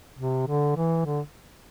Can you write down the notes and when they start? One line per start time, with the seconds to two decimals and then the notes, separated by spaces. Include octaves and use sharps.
0.18 C3
0.47 D3
0.76 E3
1.05 D3